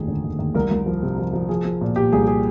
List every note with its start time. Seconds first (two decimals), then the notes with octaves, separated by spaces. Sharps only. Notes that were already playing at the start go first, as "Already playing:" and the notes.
Already playing: F1 D#2 F3 G#4
0.08 D3
0.24 D#2
0.39 D#2
0.55 C2 A#4
0.70 C2
0.86 F3
1.03 C3
1.18 F3
1.33 F3
1.49 F3 G#4
1.65 F3
1.81 A#2
1.96 A#2 G4
2.12 C2 G#4
2.27 G#4